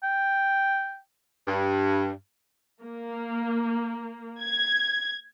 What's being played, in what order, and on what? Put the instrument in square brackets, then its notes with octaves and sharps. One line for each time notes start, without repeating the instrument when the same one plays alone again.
[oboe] G5
[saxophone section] G2
[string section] A#3
G#6